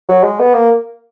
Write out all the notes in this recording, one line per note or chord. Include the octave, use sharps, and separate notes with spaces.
F#3
G#3
B3
A#3